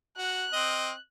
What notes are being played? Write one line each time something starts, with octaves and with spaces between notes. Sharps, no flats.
F#4 F#6
C4 D#5